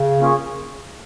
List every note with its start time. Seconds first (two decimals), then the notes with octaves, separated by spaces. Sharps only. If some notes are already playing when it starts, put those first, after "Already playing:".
Already playing: C#3
0.20 A#3 C#4 F4 G#4 C#5